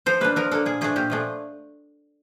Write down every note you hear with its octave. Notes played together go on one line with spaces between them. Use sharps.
F3 C5
A#3 D4 B4
F3 A#4
A#3 D4 A4
A#2 G#4
F3 A3 D4 G#4
A#2 G4
F3 A3 D4 G#4